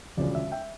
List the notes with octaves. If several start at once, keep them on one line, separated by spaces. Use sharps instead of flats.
E1 D2 C#3 F3 C#4 D5
E5
E5 G5